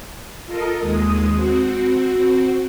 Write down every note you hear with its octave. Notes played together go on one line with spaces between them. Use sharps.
F4 A4 A#4 D#5
D#2 G#3 D#6
C4 F#4